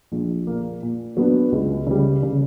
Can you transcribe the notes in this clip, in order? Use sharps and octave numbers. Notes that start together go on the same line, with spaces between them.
A#1
A#2 A#3
A#2
F#3 B3 D4
C#2
C#3 G3
C#3